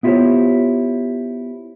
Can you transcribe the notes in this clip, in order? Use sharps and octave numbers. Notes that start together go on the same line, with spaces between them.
B3 E4 F4 G4 C5 C#5